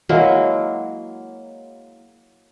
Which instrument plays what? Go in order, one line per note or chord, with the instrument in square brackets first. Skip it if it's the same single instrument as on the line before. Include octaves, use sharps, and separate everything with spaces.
[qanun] F#3 G#3 A#3 E4